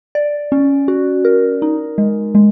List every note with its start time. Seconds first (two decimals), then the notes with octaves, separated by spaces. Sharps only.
0.15 D5
0.52 C#4
0.88 F#4
1.25 A#4
1.62 D#4
1.98 G#3
2.35 G#3